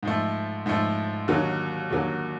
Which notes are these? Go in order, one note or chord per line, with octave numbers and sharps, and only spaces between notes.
G#2 F3 A3
G#2 F3 A3
D#2 D3 F#3 A#3
D#2 D3 F#3 A#3